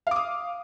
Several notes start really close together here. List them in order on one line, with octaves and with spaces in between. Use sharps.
F5 D6 D#6